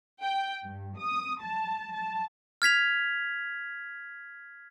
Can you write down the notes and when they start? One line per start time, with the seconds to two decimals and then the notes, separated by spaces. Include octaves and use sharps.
0.23 G5
0.64 G2
0.97 D#6
1.42 A5
1.94 A5
2.62 F6 G#6 B6 F7